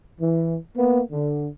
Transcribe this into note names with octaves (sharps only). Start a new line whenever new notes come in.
E3
A#3 B3
D3